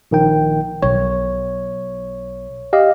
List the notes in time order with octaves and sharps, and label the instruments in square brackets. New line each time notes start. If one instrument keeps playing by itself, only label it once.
[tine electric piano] A#1 D#3 G5
[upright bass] B1 [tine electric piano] C#5
[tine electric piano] G4 D#5 F5